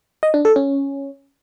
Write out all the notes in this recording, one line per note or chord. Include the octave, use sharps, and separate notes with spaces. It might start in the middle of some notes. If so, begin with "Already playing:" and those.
D#5
D4
A4
C#4